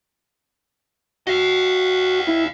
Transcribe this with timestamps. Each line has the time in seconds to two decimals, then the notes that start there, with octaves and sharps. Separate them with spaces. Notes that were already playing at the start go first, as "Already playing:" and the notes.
1.27 F#4 D#5 F5
2.27 E4